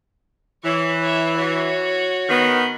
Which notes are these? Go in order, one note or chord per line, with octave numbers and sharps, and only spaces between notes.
E3 C#5
C#5 E5
F#4 C#5
D#3 B3